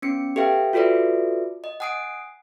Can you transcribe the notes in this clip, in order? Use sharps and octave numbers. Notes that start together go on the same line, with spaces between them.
B3 C#4 C#7
G4 A4 B4 E5 F5 G5
F4 F#4 A4 B4 D5 E5
D#5
F#5 G#5 D#6 C7 D7